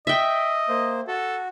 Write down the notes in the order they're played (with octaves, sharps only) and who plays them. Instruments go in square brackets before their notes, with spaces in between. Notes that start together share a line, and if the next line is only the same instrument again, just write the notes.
[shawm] D#5 [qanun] E5 G5
[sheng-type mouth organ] A#3 C5
[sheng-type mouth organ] F#4 [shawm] A4